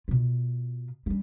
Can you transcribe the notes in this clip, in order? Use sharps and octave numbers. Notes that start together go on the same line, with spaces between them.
B2 F4
G3 C#4